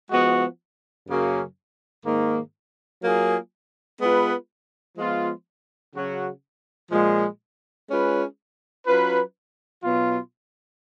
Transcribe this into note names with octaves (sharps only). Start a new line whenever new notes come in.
F3 G#3 B3 F#4
F#2 C#3 F#3 A#3 C#4
G#2 D#3 A#3
F#3 A#3 F4 G#4
G#3 B3 F4 B4
F3 G#3 B3 F4
C#3 F#3 C#4 F#4
A#2 F3 G#3
G#3 C#4 F4 B4
F#3 C#4 F4 B4
B2 F#3 B3 F4